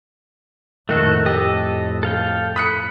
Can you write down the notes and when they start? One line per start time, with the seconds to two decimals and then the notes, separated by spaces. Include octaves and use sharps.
0.89 F2 A2 D#3 A3 F#4 A4
1.26 G4 A4 D#5
2.03 A4 F5 G5
2.56 B5 D#6 F#6 C#7